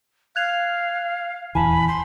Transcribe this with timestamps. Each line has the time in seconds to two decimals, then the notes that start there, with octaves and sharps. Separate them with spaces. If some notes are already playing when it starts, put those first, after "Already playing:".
0.36 F5 F#6 G#6 F7
1.55 D#1 E2 E3 G#5 A5 B5
1.88 C6